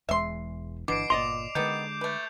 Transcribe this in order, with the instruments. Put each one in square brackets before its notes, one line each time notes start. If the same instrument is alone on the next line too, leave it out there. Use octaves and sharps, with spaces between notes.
[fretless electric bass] E1 E2 G#3 [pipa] E5 C6
[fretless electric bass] G1 E3 D4 [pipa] B2 [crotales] D6 C7 D7
[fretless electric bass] G1 A#2 [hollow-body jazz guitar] D5 D#5 C6 [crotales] F7
[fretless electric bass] D3 G#3 [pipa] D#3 B3 A4 [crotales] G6
[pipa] A3 B4